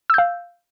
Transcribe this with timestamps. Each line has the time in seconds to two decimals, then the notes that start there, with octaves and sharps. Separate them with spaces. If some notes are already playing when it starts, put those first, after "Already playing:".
0.10 E6
0.14 G6
0.18 F5